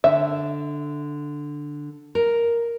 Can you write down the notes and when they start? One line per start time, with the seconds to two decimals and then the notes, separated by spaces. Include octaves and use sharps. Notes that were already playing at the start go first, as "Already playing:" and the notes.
0.04 D3 E5
2.15 A#4